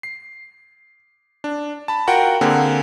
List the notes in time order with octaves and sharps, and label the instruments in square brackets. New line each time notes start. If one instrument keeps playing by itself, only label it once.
[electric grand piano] C7
D4
A5 B5
F4 F#4 A#4 F#5 G5
D3 A#3 C4 G#4